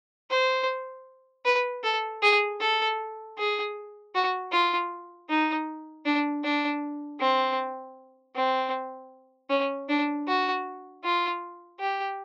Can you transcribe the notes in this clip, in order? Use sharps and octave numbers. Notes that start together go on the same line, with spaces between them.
C5
B4
A4
G#4
A4
G#4
F#4
F4
D#4
D4
D4
C4
C4
C#4
D4
F#4
F4
G4